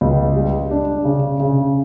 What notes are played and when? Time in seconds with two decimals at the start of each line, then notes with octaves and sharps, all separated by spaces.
0.01 C#2
0.36 G3
0.71 D4
1.05 C#3
1.40 C#3